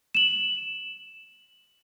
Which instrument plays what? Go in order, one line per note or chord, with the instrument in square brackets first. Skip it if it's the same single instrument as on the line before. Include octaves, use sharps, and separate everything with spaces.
[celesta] E7 F#7